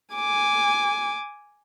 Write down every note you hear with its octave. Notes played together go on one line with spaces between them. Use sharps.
G#5 D6